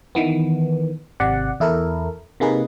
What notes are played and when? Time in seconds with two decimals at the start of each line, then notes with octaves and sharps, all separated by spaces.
0.15 D#3 E3 B3
1.20 G#1 C3 D5 F#5
1.60 E2 E4 A4 A#4
2.40 C3 A#3 D#4 G#4 B4